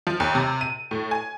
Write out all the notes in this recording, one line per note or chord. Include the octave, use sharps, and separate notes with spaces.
F3
D#2
C3
D#7
A2
G#5